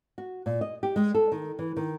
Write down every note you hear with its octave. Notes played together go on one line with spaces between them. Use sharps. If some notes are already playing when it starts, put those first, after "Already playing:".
F#4
A#2
D#5
G4
G#3
A4
D#3
E3
D#3